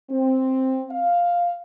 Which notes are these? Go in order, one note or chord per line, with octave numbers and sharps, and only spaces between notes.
C4
F5